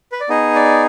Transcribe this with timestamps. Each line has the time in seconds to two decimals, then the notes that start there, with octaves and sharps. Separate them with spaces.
0.12 B4
0.20 D5
0.29 B3 D#4 G#4 D#5
0.55 D5